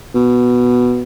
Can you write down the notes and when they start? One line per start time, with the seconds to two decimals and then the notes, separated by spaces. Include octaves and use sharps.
0.15 B2